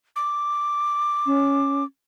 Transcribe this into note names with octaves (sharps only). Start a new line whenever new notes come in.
D6
C#4